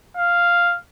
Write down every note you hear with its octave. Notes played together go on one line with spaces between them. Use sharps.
F5